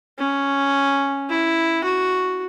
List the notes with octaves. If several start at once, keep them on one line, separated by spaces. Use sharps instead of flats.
C#4
E4
F#4